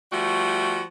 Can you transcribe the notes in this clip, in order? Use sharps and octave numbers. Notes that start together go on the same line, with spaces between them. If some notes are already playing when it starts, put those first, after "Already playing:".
F3 G3 A3 F#4